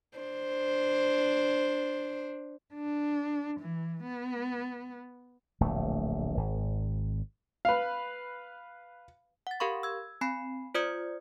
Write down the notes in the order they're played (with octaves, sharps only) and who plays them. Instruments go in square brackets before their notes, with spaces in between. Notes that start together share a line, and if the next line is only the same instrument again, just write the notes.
[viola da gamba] D4 C5
[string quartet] D4
E3
B3
[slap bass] D1 A#1 A3
G#1
[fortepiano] B4 F5
[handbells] F#5 A6
G4 A#4 F5 B5 C#6
E6 G#6
C4 G#5 B5 C7
F4 C5 D5 D#6 G#6 C#7